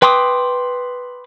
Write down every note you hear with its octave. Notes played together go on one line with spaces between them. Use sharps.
B4 G5 C6 D6 D#6